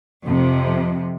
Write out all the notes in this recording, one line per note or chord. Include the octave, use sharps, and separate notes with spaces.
F2 C3